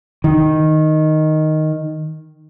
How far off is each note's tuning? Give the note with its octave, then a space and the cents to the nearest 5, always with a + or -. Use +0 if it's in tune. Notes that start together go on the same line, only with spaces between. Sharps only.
D#3 +0